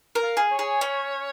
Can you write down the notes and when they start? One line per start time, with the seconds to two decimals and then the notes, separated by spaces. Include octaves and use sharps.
0.15 A#4
0.23 F5
0.37 G#4
0.51 C#5
0.59 G#4
0.81 C#4